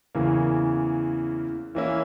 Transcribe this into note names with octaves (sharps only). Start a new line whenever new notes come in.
E2 C#3 E3 A#3
E3 A#3 C#4 E4